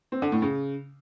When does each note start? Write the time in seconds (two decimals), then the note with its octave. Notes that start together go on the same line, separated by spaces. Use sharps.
0.12 C4
0.22 D3
0.32 A2
0.42 C#3